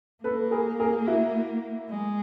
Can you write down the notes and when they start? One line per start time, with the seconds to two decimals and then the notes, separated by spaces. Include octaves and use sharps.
0.24 A#3 A4 B4
0.51 G#4 A#4
0.80 G#4 A#4
1.07 E4 F#4
1.90 G#3